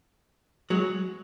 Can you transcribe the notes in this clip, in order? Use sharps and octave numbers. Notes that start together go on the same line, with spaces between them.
F#3 G#3